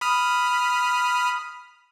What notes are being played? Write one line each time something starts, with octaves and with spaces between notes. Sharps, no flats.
B5 D#6 F6